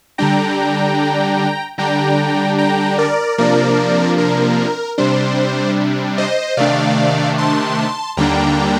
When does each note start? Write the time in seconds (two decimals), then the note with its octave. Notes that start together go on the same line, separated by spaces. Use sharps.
0.18 D3 G3 D4 G5 A#5
1.78 D3 G3 D4 G5 A#5
2.58 G5 A#5
2.98 A#4 D5
3.38 C3 F3 A#3 D4 A#4 D5
4.18 A#4
4.98 C3 G3 D4 C5
6.18 C5 D#5
6.57 C3 D#3 A3 D4 D5 F5
7.38 A5 C6
8.17 D#2 D3 G3 A#3 D4 G5 A#5